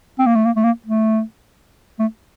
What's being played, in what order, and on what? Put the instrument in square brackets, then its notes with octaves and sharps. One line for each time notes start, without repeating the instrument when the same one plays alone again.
[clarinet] C4
A#3
A3
A#3
A3
A#3
A3
A3